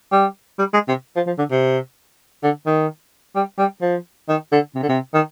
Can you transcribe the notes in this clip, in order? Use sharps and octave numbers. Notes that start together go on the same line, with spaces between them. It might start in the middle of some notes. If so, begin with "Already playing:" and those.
G3
G3
G#3
C3
F3
F3
D3
C3
D3
D#3
G3
G3
F3
D#3
D3
C3
D3
C3
D#3